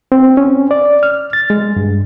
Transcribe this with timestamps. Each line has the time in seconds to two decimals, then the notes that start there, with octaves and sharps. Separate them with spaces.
0.12 C4
0.37 C#4
0.71 D5
1.03 F6
1.33 A6
1.50 G#3
1.76 G2